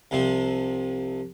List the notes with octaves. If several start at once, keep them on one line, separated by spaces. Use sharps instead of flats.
C2 C3 F3